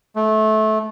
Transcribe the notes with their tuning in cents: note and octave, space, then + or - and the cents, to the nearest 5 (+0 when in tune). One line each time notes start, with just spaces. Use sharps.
A3 -20